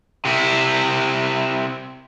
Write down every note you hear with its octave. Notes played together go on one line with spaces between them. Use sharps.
C3 E4